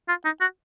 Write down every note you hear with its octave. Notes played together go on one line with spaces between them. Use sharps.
F4
D#4
F#4